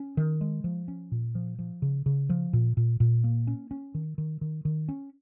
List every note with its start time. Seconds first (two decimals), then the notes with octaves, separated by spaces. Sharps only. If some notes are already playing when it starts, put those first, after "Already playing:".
Already playing: C#4
0.17 D#3
0.41 G#3
0.64 F3
0.88 C#4
1.12 A#2
1.35 F3
1.59 F3
1.82 C#3
2.06 C#3
2.29 F3
2.53 A#2
2.77 A#2
3.00 A#2
3.24 A#3
3.47 C#4
3.71 C#4
3.95 D#3
4.18 D#3
4.41 D#3
4.65 D#3
4.89 C#4